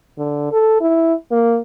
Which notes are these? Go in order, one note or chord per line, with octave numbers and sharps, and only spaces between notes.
D3
A4
E4
A#3